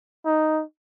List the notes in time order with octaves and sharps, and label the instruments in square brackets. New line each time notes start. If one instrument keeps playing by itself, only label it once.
[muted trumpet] D#4